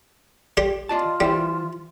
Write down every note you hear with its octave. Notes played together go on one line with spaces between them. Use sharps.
G3 G4 C6
F4 D5 D#5 A5
E3 G3 E4 C5